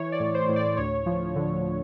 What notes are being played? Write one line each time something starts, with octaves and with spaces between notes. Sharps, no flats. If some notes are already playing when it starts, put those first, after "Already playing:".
Already playing: E3 C#5
D5
A2
C5
A2
D5
D2 C#5
F3
D3